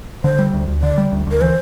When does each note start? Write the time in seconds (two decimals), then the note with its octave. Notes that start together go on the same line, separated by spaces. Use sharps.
0.24 D3 C5
0.39 G3
0.53 D2
0.68 D2
0.83 D3 D5
0.98 G3
1.12 D2
1.27 D2 A#4
1.41 E3 C5